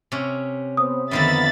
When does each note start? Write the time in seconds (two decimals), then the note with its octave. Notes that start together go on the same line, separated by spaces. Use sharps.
0.12 C3 C#4
0.77 B3 C5 D#6
1.11 F2 D3 D#3 A#3 B3 E5 B5 A6